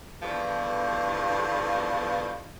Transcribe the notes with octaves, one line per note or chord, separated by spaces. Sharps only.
E2 G2 B2 D3 F3